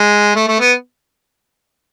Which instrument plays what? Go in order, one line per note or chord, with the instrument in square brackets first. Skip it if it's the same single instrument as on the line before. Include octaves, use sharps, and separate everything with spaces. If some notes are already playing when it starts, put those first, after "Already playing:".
Already playing: [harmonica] G#3
A3
A3
B3